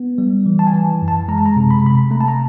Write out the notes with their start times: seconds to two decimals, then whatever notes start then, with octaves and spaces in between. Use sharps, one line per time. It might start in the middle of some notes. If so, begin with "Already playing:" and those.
Already playing: B3
0.18 G3
0.46 E3
0.59 A5
0.67 G#5
0.73 E3
1.02 F#2
1.08 A5
1.28 G#3 A#5
1.38 A5
1.46 A#5
1.56 C3
1.71 B5
1.84 C3 B5
2.11 A3 A#5
2.21 A5
2.28 A#5